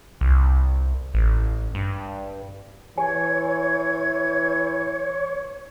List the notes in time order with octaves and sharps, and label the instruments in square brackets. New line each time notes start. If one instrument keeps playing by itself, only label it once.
[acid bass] C2
A1
G2
[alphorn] E3 [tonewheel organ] C#5 [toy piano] G#5 [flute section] G#6